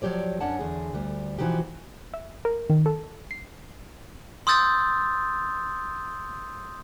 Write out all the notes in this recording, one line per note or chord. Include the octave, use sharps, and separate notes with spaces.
F3 F#3 G4 C#5 D5
F#2 C#4 D4 F#5 A5
E2 D3 G#4
D2 G3
B2 E3 F3 D#4 F#4 G4
E5
A#4
D#3
A4
C7
C6 D#6 E6 G6 A6